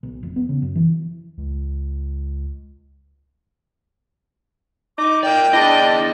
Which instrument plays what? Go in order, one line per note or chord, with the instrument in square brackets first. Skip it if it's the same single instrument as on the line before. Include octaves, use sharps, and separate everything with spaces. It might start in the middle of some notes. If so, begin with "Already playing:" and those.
[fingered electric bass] B1
F1
B3
C#3
F#2
E3
[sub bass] C#2
[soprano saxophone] D#4 [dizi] D6
[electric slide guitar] A#4 D5 [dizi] G5
[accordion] D4 D5 [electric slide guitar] E4 G#4 [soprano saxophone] D#5